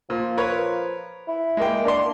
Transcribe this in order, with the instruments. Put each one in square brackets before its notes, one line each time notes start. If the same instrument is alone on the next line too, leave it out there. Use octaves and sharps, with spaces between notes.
[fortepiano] A#2 [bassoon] F3
[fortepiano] A#4 B4 C#5
[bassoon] E4
[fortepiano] G#3 A#3 G5
[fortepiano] A#3 C6 [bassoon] D4